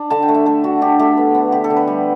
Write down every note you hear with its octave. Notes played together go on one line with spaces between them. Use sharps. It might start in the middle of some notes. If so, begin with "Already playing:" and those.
Already playing: D4
D3 A5
G5
A3
E5
A3 A4
D4 F#4
D4 G4
A3 G4
B3
B3
D3 G4
A4
D3
B4
G3